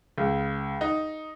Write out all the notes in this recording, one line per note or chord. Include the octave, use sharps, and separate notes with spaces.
C#2
D#4